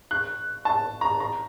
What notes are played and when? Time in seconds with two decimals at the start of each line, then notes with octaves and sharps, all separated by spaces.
0.11 F#6
0.65 A5
1.01 A#5
1.20 A#5